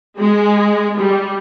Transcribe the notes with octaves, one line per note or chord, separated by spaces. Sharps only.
G#3
G3